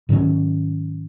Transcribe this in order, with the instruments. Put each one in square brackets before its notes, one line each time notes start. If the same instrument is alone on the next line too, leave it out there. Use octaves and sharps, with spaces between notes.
[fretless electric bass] G#2 D#3 F#3 C#4